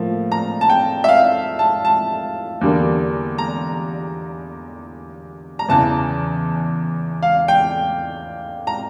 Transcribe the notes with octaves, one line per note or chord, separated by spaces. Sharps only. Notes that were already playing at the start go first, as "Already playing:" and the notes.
Already playing: A2 F3 A#3
A#5
A5
G5
E5
F5
A5
A5
E2 D3 G3 A#3
A#5
A#5
E2 C#3 E3 A5
F5
G5
A#5